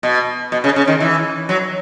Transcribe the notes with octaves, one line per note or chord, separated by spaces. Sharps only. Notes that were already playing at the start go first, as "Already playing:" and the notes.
B2
B2
C#3
C#3
D#3
E3
F#3